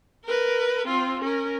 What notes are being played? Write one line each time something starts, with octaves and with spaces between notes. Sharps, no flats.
A#4 B4
C4 F4
C#4 A#4